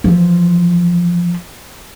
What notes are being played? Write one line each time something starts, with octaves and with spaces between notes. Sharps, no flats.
E3 F3